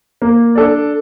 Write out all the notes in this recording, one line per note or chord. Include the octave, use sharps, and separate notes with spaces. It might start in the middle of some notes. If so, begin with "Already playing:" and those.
A#3
D4 A4 D5